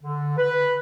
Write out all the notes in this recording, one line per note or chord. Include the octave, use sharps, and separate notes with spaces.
D3
B4